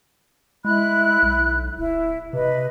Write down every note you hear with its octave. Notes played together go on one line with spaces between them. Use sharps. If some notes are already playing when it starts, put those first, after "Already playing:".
G#3 E4 B5 F#6
B1
D1 E4
C3 B4 D#5